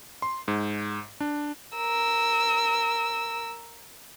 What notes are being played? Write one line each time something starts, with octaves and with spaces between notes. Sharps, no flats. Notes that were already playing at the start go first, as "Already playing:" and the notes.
C6
G#2
D4
A#4 E6